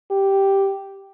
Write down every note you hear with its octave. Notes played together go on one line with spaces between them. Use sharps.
G4